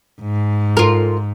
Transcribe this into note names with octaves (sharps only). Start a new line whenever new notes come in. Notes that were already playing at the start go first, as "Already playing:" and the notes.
G#2
F4 A#4